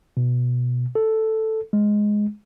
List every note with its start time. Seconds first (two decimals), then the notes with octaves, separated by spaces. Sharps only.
0.17 B2
0.95 A4
1.73 G#3